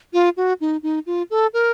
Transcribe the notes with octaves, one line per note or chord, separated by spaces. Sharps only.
F4
F#4
D#4
D#4
F4
A4
A#4